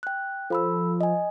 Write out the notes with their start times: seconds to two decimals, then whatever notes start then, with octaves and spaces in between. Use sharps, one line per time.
0.03 G5 F#6
0.50 F3 A4 B5 E6
1.01 D#5 G#5